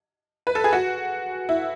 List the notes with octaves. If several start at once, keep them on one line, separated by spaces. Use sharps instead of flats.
B4
A4
G#4
F#4
E4